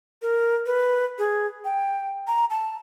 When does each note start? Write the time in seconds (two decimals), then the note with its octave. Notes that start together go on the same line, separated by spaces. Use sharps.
0.22 A#4
0.66 B4
1.18 G#4
1.65 G5
2.27 A#5
2.50 A5